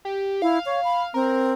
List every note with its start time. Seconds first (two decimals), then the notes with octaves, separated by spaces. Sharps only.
0.05 G4
0.42 E4 F5
0.66 C#5
0.84 B5
1.14 C4 A#4